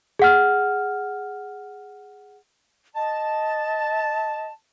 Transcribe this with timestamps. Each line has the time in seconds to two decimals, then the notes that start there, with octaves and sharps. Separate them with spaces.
0.19 G#4 F#5 F6
2.96 D#5 A5